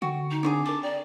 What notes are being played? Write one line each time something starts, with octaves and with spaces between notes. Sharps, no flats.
D3 F#4 G5
D#4
C4 D4 G#4 C5 D6
A4 A#4 A5 D6
D5 G5 A#5